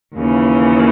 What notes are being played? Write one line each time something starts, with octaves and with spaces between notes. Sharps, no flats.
D#2 C#3 E3